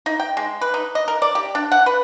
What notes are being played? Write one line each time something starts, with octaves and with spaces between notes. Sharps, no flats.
D#4
G5
G#3
B4
D#4
D#5
A#4
D5
G4
D4
F#5
B4